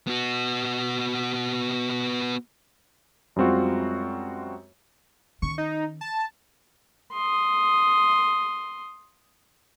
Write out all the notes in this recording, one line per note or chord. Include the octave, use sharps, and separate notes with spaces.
B3 F#4
F#2 G3 G#3 C4 F4 F#4
D#3 C#4 C#6
D#4
A5
C6 D#6